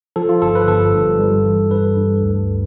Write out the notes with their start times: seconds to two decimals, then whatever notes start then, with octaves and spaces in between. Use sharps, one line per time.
0.16 F3 A4
0.29 F4
0.42 G1 A4
0.55 B4
0.68 G1 A4
0.94 G2
1.19 G3
1.45 E3
1.71 G2 B4
1.96 G2
2.23 D2